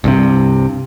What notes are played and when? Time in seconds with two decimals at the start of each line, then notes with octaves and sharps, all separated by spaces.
0.04 C2 G2 C3